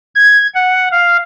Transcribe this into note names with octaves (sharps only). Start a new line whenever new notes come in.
G#6
F#5
F5